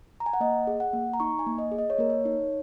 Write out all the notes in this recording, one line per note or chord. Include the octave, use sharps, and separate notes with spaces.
A#5
G#5
F#5
A#3 D#5
G#4
F#5
A#3
A#5
D#4 C#6
G#5
A#3
D#5
G#4
D#5
C#5
A#3 A#4
C#5
D#4